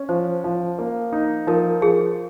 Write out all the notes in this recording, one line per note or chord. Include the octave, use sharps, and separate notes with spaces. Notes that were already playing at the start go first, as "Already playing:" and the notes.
Already playing: C#4
F3 C5
F3
A#3
D#4
F3 A#4
F3 G#4